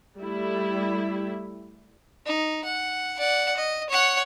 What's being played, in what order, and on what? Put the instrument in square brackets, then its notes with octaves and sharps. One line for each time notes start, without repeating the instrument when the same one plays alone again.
[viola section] G3 A3 E4
[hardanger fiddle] D#4
F#5
D5 F#5
D#5
C#5 F#5